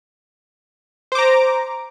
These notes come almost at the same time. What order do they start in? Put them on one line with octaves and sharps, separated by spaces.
C5 D6 A#5